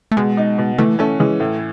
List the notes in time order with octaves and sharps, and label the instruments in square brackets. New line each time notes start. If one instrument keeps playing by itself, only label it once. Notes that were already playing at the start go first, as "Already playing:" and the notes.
[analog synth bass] A3
[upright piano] B2 [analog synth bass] G#3
[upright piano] D#4
B2
[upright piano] E3 [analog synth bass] A3
[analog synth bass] A3 [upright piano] C#4
[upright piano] E3 [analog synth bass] G#3
[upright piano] A2 [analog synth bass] A3